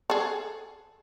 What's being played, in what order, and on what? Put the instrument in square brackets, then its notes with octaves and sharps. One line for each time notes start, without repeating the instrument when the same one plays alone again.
[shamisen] G#4 A4